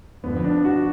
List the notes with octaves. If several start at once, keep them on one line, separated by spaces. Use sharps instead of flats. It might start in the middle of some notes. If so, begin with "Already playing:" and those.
F2 D3 F3 B3
D4
F#4